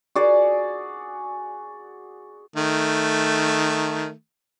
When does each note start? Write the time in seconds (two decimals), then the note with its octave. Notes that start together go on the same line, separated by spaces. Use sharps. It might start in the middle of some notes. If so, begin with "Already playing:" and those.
0.15 F#4 G#4 D5
2.56 D#3 A3